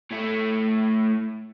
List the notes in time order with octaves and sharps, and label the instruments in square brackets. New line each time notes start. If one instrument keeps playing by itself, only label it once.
[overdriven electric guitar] A2 A3